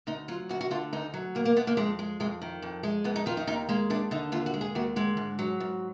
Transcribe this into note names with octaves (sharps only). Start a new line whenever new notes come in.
D2 D#4
F#3 F4
D2 F#4
F#4
D3 F4
D2 D#4
F#3
D2 A#3
A#3
D3 B3
A#3
F2 G#3
G#3
F2 G#3
D#3
F2
G#3
F2 B3
D#4
D#3 F4
D#4
D#2 D#4
G#3 A#3
D#2 D4
D3 D#4
D#2 F4
F#4
G#3
G#4
D#2 F#4
D3 G#3
G#2
F#3
G#2